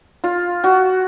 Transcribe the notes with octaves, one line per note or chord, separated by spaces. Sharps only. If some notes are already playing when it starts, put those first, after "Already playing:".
F4
F#4